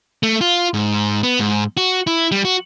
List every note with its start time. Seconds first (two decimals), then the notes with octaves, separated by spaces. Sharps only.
0.23 A3
0.41 F4
0.74 G#2
1.23 B3
1.40 G#2
1.77 F#4
2.07 E4
2.32 G3
2.45 F#4